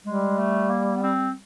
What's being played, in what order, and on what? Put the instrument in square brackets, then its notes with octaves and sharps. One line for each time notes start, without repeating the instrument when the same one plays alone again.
[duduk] G3 [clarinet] G#3
[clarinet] A3
A#3
B3
C4